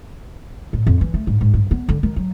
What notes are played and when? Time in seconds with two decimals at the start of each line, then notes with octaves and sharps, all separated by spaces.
0.73 A2
0.87 F2
1.01 E3
1.14 A3
1.27 G#2
1.41 G#2
1.54 G2
1.71 B3
1.89 D3
2.03 D#3
2.16 F#3